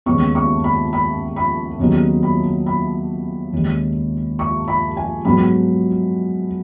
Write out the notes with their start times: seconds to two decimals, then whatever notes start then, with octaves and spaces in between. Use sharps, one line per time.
0.06 D#2 C#3 G#3 B3 C#6
0.35 C#6
0.64 B5
0.93 B5
1.36 B5
1.79 D#2 C#3 F#3 B3 D#4
2.23 B5
2.66 B5
3.53 D#2 C#3 G#3
4.39 C#6
4.68 B5
4.97 G#5
5.25 G#2 F#3 B3 B5